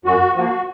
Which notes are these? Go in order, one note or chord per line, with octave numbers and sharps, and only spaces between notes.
F#2 F#4
F3 A#3 F#4